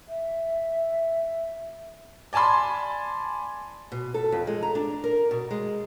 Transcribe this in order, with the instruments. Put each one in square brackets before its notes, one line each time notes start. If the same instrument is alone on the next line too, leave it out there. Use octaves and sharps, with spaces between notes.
[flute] E5
[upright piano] D5 G#5 A5 B5 C6
[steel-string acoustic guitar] B2
A4
F2
G#3
A#5
D4
A#4
B2
G#3